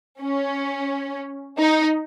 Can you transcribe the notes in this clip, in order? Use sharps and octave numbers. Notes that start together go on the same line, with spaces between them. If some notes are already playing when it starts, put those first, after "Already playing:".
C#4
D#4